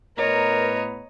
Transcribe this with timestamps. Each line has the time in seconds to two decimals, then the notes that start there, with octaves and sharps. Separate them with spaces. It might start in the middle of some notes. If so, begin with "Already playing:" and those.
0.18 A2 B3 A#4 B4 C#5 D#5 A#5